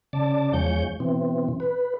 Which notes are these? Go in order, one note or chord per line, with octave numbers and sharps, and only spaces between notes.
C#3 D5 A5
E2 F3 G#3 C#5 G6
B2 E3 C4
B4